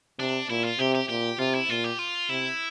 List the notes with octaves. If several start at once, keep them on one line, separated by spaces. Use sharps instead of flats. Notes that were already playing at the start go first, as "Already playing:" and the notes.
C3 D4
A#2 E4
F4
C3 G4
G4
A#2 G4
C3 F4
E4
A#2 F4
G4
F4
C3 E4